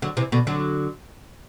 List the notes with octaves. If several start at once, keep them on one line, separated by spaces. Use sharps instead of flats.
D3 F#3
C3 E3
B2 D3
D3 F#3